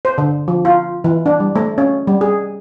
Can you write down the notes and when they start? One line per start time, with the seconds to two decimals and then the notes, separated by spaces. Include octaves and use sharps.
0.05 C5
0.18 D3
0.48 F3
0.65 F4
1.04 E3
1.26 D4
1.40 G3
1.56 A3
1.78 C#4
2.07 G3
2.21 G#4